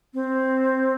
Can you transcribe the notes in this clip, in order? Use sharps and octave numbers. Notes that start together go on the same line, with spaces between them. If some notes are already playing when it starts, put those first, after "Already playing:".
C4